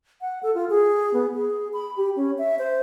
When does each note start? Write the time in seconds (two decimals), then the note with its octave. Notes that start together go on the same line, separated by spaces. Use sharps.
0.21 F#5
0.43 A4
0.55 F4
0.70 G#4
1.14 B3
1.34 G#4
1.73 B5
1.97 G4
2.16 C#4
2.38 E5
2.59 C5